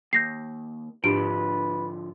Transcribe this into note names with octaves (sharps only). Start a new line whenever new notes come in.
D#2 G6 A#6 C7
G#2 D3 F3 D4 G4 B4 D7